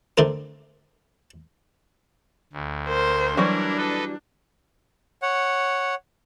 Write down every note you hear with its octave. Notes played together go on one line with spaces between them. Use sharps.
D3 A3 C4 A#4
D2
A#4 C5
E3 F#3 G3 D4 E4 A#4
A4 B4 D#5
C#5 F#5